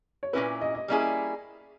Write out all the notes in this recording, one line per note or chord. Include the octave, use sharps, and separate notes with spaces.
C#5
A#2 A#3 C#4 E4 B4
D#5
D#5
G3 A#3 C#4 E4 G#4